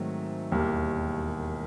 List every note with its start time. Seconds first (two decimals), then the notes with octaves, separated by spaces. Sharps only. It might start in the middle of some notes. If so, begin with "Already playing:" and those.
Already playing: G#2 D#3 F#3 A3 C4
0.51 E1 D#2 D#3 G3 A#3